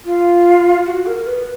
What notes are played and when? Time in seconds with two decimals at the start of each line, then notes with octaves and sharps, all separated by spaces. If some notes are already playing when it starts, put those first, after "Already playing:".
0.06 F4
0.86 F#4
1.06 A#4
1.17 A#4
1.26 B4